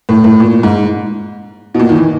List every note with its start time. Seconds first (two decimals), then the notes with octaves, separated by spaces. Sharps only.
0.09 A2
0.24 A2
0.40 A#2
0.63 G#2
1.74 B2
1.79 A#2
1.89 D#3
1.96 E3